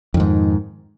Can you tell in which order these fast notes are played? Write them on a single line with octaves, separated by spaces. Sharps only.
F2 D#3 G#2